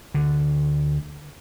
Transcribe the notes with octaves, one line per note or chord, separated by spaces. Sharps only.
D2 D3